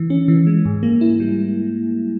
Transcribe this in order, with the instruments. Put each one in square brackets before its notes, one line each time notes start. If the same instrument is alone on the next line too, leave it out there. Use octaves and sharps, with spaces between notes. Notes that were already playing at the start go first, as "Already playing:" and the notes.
Already playing: [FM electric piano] E3
C#4
E3
G#3
G#2
A#3
E4
G3